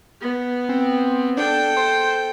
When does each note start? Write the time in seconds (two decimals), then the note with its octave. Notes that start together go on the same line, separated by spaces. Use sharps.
0.21 B3
0.69 C4
1.37 D4 A4 G5
1.77 C5